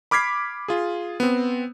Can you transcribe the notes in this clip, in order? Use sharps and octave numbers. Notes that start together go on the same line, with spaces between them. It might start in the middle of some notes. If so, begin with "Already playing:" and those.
B5 D6 F6 G#6 B6 C7
F4 G#4
B3 C4